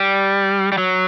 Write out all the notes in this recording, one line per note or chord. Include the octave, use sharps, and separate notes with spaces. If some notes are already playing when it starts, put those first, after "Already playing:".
Already playing: G3
G3
F#3